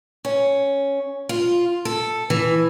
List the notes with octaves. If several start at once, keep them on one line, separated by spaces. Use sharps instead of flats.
C#4
F4
A4
E3